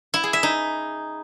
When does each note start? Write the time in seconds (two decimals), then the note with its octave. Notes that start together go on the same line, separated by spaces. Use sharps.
0.14 E4
0.23 G#4
0.33 E5
0.43 D#4